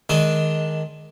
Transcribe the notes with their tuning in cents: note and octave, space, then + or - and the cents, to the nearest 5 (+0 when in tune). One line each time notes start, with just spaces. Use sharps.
D#3 +0 G#3 +15 D4 +0